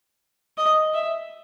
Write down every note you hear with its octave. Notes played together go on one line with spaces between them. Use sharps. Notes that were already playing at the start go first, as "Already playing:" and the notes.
D#5
E5